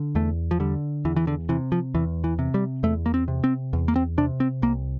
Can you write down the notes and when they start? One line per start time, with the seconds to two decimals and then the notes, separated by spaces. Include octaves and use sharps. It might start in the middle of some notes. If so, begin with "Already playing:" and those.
Already playing: D3
0.15 E2 A3
0.51 F3
0.60 D3 G3
1.05 E2 E3
1.16 E3
1.27 D3
1.49 C3 E3
1.72 F3
1.95 E2 E3
2.24 E3
2.39 C3
2.54 G3
2.83 E2 A3
3.06 A#3
3.14 C4
3.28 C3
3.44 C4
3.73 E2
3.88 A#3
3.96 C4
4.18 C3 D4
4.40 C4
4.62 C2 A#3